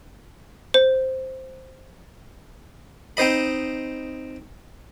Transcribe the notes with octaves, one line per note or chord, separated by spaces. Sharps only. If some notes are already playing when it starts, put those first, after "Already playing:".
C5
C4 D#4 C5 D#5 B5